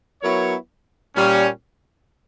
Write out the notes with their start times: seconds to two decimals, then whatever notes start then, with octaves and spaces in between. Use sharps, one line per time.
0.22 F#3 B3 E4 A#4 C#5
1.15 A#2 G3 C#4